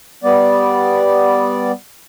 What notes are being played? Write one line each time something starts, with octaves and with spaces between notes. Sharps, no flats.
G3 B3 D5